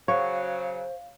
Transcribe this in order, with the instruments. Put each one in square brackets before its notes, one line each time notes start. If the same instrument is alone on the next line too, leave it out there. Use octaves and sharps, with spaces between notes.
[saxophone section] C#3 F#3 [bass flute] C5 [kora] C#5 [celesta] F5